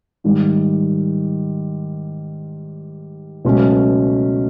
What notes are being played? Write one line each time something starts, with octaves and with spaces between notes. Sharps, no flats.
G#2 D#3 G3
C#2 B2 F#3 A3 C#4